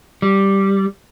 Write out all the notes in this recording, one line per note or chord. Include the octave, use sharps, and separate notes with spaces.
G3